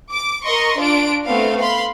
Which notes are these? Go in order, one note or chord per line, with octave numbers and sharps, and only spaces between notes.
D6
A#4 D#5 C6 C#6
D4 F4 D7
A3 B3 C4 A4 F5
F5 B5 C6